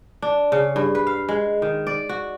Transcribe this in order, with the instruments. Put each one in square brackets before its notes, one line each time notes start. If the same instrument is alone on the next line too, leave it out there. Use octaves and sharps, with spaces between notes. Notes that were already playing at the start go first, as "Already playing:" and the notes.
[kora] D4
C#3
G2
B4
F5
G#3
D#3
D5
F#4